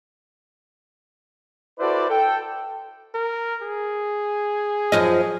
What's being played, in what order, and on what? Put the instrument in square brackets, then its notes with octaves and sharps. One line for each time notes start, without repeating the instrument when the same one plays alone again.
[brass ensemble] E4 F#4 A4 B4 C5 D5
A4 G5
[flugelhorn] A#4
G#4
[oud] F#2 F3 D#5